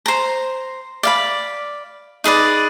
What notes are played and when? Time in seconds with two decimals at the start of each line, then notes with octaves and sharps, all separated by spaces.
0.06 C5 A#5
1.03 D5 F5 B5
2.24 D#4 G#4 B4 D5